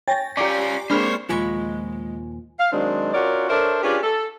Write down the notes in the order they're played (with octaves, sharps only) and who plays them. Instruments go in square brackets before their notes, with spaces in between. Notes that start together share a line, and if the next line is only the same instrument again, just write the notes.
[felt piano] C#5 G5 G#5 [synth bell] A6 A#6
[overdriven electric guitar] C#4 F4 [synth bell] G4 D5 [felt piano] A#5 D6
[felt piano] G#3 A#3 C4 [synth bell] D4 B5 F6 [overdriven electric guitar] C5 C#5
[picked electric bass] D#2 A#2 F3 [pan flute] G#3 [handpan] F4 [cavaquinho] G#4 B5 C#6
[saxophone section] F5
D#3 F#3 G#3 C4 D4
C#4 F4 F#4 A#4 C#5 D5
D4 A4 A#4 C5 C#5 E5
C#4 D4 F4 G4 G#4 B4
A4